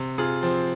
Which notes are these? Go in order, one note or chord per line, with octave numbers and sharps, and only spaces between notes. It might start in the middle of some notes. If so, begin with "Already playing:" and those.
Already playing: C3
C3 F4 G#4
F3 C4